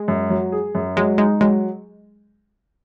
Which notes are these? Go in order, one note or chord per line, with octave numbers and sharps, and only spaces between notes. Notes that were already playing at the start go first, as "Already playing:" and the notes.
Already playing: G#3
F#2
F#3
G#4
F#2
F#3 G#3
G#3 D#4
F#3 G#3